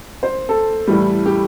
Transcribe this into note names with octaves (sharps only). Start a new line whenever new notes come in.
C5
A4
A2 E3 G3
G4